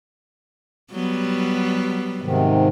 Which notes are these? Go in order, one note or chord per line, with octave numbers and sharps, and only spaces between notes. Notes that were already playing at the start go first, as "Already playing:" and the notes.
F#3 G3 B3
G#2 C3 D#3